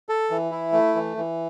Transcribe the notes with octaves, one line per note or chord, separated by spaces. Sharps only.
A4
E3
E4
A3
E3
E3